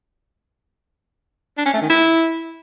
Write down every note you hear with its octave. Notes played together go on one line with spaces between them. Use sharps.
D4
C#4
A3
D#3
E4